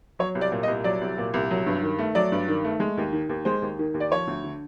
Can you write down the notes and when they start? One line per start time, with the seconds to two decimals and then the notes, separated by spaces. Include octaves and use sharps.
0.19 F#3 C#5
0.35 C2
0.41 D5
0.52 A#2
0.63 D#5
0.68 C2
0.84 F#3 D5
1.01 C2
1.18 A#2
1.34 C2
1.50 F#3
1.66 G2
1.83 D#3
1.99 A3
2.15 F#3 D5
2.32 G2
2.48 D#3
2.64 A3
2.80 G#3
2.97 D#2
3.13 D#3
3.29 D#2
3.45 G#3 C5
3.62 D#2
3.79 D#3
3.94 D#2
4.00 D5
4.11 F3 C#5
4.27 D2
4.44 D3